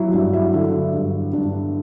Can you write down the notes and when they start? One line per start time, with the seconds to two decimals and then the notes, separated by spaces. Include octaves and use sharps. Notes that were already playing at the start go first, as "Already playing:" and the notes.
Already playing: F#3 E4 F#4
0.13 G2 E4
0.33 E4
0.54 D3 E4
0.93 G2
1.33 G2 D4